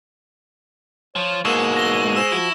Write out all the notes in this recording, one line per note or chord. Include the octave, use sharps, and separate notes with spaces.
F3 F4 C#5
G#2 B2 G#3 A#3 C#6 E6 E7
A#6 G7
C5 G#5 E6 E7
F3 E4 F#4